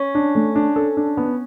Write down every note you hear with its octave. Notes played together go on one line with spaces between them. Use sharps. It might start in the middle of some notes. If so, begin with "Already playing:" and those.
Already playing: C#4
D4
A3
D4
A4
D4
B3